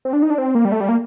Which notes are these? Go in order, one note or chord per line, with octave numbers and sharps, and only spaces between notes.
C4
D4
D#4
D4
C4
A#3
G3
A3
G3
A#3